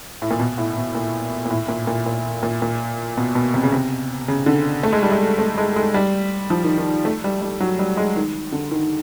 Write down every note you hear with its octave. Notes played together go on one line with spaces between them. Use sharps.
A2
A#2
B2
A2
B2
A#2
A#2
A2
A#2
A#2
A#2
A#2
A#2
B2
B2
C3
C#3
C3
C#3
D3
A3
G#3
G3
G#3
A3
G#3
G#3
G3
F3
D#3
D#3
A3
G3
G3
F#3
G3
G#3
D#3
D3
D#3